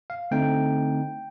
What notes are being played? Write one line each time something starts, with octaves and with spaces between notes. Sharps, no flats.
F5
D3 A3 C4 D#4 G5